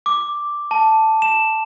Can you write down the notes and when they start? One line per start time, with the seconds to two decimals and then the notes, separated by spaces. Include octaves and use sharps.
0.06 D6
0.71 A5
1.22 E7